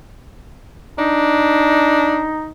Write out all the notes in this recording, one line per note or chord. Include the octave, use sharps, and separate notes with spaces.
D4 D#4